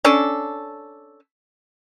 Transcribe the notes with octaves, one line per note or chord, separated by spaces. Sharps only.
C#4 D4 A4